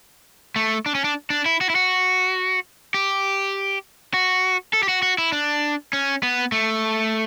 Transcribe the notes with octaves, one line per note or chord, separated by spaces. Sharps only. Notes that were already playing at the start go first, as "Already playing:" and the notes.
A3
D4
C#4
D4
D4
E4
F#4
E4
F#4
G4
F#4
A4
G4
F#4
F#4
E4
D4
C#4
B3
A3